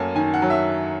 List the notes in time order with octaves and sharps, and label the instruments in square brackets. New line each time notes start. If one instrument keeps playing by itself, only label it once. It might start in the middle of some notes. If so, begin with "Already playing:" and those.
Already playing: [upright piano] F#2 A3 A#3 G#5 A5
D#3 G#5
F#5
F#3
E5